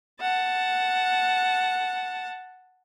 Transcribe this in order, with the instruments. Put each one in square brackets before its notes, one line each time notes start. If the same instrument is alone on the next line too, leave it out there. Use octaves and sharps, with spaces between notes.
[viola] F#5 A5